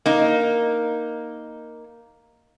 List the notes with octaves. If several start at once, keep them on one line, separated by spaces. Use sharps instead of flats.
A#3 D#4